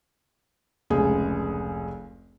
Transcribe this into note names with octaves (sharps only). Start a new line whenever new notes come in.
F1 C#2 G#4